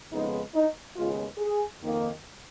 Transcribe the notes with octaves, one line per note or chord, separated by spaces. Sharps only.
F2 C#3 G#3 B3 D#4
D#4
D#2 C#3 G#3 B3 F4
G#4
F2 D#3 A#3